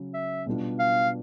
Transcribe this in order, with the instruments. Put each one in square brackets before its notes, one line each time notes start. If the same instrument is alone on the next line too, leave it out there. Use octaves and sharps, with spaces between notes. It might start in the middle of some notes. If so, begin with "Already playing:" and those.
Already playing: [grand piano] C#3 F#3 C#4
[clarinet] E5
[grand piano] B2 G3 B3 D4 F4
[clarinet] F5